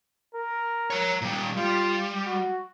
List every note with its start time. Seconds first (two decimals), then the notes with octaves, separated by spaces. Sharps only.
0.35 A#4
0.90 C#5 A#5
1.21 A#2 G3
1.57 G3 F4
2.26 F#4